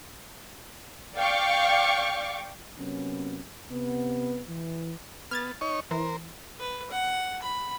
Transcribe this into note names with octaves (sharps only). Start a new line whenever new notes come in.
D5 F5 G5 C#6 D6
C3 F#3 A#3 B3 C#4
C3 B3
E3
B3 F6 G#6 A6
D#4 C#5 C#6
E3 A#4 C5
B4
F#5
B5